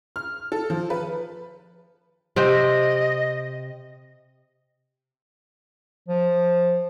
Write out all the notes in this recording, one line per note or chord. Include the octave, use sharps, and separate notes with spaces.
F6
A4
F3
B4
C3 C4 G4 D#5
F3